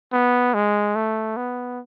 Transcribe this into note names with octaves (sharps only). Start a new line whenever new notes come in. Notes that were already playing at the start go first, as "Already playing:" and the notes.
B3
G#3
A3
B3